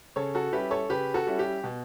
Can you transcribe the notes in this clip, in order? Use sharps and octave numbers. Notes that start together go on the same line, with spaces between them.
C#3 A4 C#5
F#4 A4
G3 C#4 E4 G4 B4
A4 C#5
C#3 G4 B4
F#4 A4
G3 C#4 E4
G4
B2